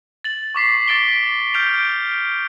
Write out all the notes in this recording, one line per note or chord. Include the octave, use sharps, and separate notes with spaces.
A6 F#7
C#6 D6 B6 C7
D6 A6 D7 G7
F6 G6 D7 F7